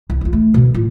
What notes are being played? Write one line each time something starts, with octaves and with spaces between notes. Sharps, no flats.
C2
E2 F4
A3
B2 D3
A2 F4